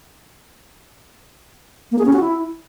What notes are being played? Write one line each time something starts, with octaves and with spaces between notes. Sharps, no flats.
A#3
G#4
C#4
F#4
E4